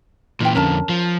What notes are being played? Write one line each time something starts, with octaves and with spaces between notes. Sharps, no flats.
A#2 E3 F4 G5
F2 D3 C#4 A#4 A5
F3